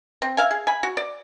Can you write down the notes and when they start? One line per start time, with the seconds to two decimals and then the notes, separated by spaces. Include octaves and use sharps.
0.22 C4
0.37 E5 F5 G#5
0.51 G#4
0.67 G#5 B5
0.83 F#4
0.97 D5